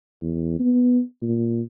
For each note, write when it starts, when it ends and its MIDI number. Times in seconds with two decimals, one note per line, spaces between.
0.22 0.56 40
0.60 1.01 59
1.22 1.61 46